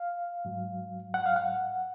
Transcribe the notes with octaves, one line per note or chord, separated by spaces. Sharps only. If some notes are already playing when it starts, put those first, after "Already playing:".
Already playing: F5
G#2 F#3
F#5
F5
F#5